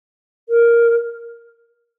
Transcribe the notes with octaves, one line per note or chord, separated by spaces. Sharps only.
A#4